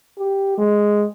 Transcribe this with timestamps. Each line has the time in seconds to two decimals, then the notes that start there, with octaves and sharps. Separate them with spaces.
0.19 G4
0.58 G#3